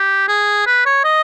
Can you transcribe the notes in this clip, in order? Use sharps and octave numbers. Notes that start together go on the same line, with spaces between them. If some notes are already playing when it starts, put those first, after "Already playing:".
Already playing: G4
G#4
B4
C#5
D#5